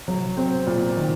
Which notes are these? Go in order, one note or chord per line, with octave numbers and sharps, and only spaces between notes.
F#3
C4
A#2
D#3